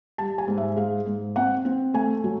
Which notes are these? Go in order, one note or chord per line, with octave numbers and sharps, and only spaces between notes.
G3 A5
G#5
G#2
E5
G#3 F5
G#2
C4 F#5
C4
A3 G#5
F#3